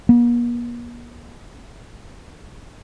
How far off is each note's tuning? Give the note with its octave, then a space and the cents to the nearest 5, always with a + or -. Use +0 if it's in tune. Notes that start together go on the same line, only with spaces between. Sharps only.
A#3 +45